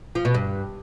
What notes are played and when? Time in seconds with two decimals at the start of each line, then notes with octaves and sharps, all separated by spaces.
0.15 F3
0.25 B2
0.34 G2